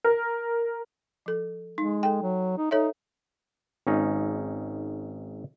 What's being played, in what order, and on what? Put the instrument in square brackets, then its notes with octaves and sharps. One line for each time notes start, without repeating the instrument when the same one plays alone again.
[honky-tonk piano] A#4
[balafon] F3 A4
[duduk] G#3 [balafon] D#4
[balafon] A4 G5
[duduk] F#3
D#4
[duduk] D#4 [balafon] A4 C#5 E5
[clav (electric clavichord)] G#1 C#4 D#4 F5